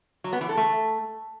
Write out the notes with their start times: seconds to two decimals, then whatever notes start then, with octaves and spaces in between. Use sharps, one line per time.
0.24 F#3
0.33 B3
0.41 E3
0.49 A4
0.57 A3